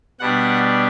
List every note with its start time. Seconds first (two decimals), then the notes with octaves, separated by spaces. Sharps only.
0.20 B2 G3 D4 F#5